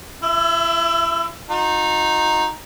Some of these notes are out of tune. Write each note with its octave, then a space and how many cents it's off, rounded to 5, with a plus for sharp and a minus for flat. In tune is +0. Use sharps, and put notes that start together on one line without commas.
E4 +35 E5 +5
D#4 +0 F#4 -45